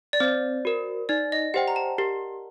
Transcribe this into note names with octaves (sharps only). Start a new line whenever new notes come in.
D5
C4 C5
F#4 A#4
D#4 D5
D#5
G4 C5 F#5 G5
A#5
A5
G4 A#4